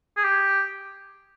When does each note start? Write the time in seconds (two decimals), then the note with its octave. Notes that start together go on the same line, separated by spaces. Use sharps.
0.17 G#4
0.24 G4